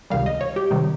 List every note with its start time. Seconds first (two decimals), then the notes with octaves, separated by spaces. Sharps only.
0.10 C#2 C3 D#3 G3 F5
0.26 D#5
0.41 C#5
0.56 G4
0.71 C3 D#3 G3